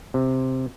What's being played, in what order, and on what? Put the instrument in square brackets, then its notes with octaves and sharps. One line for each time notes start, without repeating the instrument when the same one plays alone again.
[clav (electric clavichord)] C3